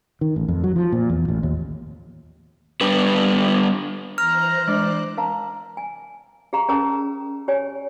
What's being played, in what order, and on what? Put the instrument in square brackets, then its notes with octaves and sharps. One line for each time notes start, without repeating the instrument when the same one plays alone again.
[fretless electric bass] D#3
A1
F2
F#3
F3
A#2
E2
A1
D#2
[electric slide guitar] G3 B3 D4 B4
[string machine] E3 C5 F#6 [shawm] A#5 [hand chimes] F6
[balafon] G#3 D4 [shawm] D5
[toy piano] A#4 F5 A5 A#5
G#5
G4 G#4 F5 A#5 C#6
C#4 G#4 A#4 A5 A#5 D#6
G4 C#5 G#5